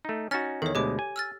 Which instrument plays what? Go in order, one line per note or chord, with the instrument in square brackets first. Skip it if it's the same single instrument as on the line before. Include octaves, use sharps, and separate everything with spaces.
[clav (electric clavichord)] A3 D#4
[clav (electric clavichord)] C#4 D#4 F#4 [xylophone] F6 A6
[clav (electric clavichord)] E2 D#3 [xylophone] A4 C#5
[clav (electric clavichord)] D2 B2 G#3 [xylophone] G4 D6
[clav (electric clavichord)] G#5
[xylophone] E6 F6 A6